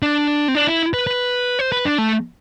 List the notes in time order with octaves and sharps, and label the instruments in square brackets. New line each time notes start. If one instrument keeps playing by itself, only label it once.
[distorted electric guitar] D4
C4
D4
E4
B4
B4
C5
B4
D4
A3